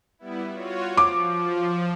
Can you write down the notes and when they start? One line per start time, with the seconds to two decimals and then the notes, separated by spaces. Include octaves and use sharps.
0.19 G3 B3 E4
0.52 F4 F#4 C#5
0.97 F3 D6